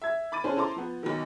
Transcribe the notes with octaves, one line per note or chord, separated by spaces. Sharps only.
E5 G#6
B5 D6 A6 D#7
C#4 D4 G#4 C5
E4 A4 C5 A#5 C6 D6
F3 B3
B1 B2 D#3